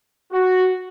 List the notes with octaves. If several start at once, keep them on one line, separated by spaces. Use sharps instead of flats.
F#4